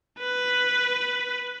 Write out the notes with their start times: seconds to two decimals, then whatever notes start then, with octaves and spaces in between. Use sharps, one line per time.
0.20 B4